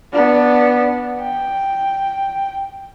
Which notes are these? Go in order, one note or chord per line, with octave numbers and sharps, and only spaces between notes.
B3 D4
G5